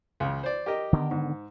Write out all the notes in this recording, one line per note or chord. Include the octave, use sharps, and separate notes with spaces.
C#2 C#3
C5 D5
G4 A#4 D#5
D3 D#3 B3
G#2